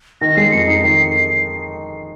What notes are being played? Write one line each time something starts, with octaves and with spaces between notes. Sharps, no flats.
D#3 A#6
G#3 C7
F2 C#7
D#4 C7
D#3